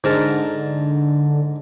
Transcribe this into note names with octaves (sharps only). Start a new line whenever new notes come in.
G#2 D3 A#4 A5